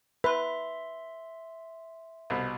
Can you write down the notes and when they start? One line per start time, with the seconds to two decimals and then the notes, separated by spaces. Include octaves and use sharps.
0.24 B4 E5 C6
2.30 C2 B2